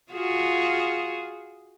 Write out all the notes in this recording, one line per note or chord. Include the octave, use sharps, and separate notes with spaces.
F4 F#4 G#4